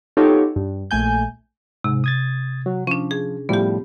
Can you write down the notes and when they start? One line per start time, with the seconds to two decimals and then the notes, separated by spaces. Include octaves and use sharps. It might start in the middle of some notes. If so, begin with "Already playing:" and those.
0.17 B3 D#4 F4 G4 A4 C#5
0.56 G2
0.91 A#1 A3 G#5 G6
1.84 G#2 C3
2.04 D#6 G#6 A6
2.66 F#3
2.87 F3 C#4 D4
3.11 G#4
3.49 A2 F3 G3 B3 G4